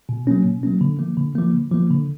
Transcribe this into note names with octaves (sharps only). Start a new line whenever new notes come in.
B2
F#3 A#3 C#4
B2
F#3 A#3 C#4
D3
F3 A#3
D3
F3 A#3
D3
F3 A#3
D3